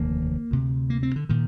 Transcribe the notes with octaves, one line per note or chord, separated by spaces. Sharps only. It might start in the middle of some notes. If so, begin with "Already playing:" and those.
Already playing: F1 D#2 D3 A#3
D2 C3
A#3
C4
D3
A#2 D#3